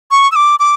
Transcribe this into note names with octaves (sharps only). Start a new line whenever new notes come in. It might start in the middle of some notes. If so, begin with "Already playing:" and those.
C#6
E6
D6
D6